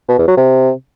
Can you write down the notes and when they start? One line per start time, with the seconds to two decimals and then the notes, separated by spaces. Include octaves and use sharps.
0.09 B2
0.18 E2
0.28 F#3
0.37 C3